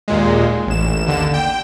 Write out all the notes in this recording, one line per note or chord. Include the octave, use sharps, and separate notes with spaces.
D#2 A#2 G#3
A1 E7
D#2 D3 E7
G5